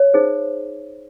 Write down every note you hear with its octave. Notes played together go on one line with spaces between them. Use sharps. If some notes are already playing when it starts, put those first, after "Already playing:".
Already playing: C#5
D#4 G#4 C5